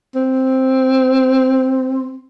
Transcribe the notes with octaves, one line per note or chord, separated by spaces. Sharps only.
C4